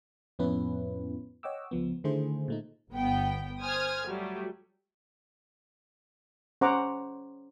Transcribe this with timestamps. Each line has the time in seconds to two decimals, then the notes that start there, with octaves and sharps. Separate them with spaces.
0.39 F2 A2 B3 C#4 E4 B4
1.43 C#5 D#5 F#5 G5 D6 E6
1.71 C#2 F3 B3
2.04 D3 D#3 A3 E4 G#4 C5
2.48 A#2 A3 D#4
2.91 G1 B3 G5
3.59 C5 G#5 D#6 F6 G#6
4.05 F#3 G3 A3
6.61 C#4 C5 F#5 A#5 D6